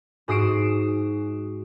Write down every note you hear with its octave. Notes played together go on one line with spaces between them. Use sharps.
G#2 F#4 D#6 C7 D7 E7